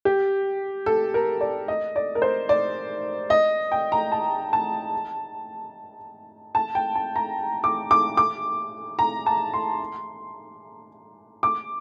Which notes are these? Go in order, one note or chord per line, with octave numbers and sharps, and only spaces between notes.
G4
A4
A#4
D5
D#5
D5
A#4
C5
D5
D#5
G5
A#5
A5
A5
A5
G5
A5
A#5
D6
D6
D6
A#5
A5
C6
D6